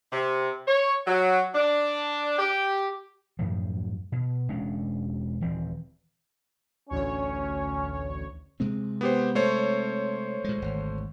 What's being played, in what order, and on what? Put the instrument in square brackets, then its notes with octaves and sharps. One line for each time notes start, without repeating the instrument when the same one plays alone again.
[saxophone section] C3
C#5
F#3
D4
G4
[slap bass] F#2 A2 F3
B2
E1 G#3 C#4 D4
D#1 E3 C4
[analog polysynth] A1 D2 C#5 [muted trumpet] C#4
[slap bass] C3 G#3 C4
[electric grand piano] B3 G4 C5
A3 C5 C#5
[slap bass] A#2 G#3
G#1 D2